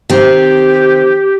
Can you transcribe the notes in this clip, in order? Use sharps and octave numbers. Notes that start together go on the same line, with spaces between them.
D#3 C4 G4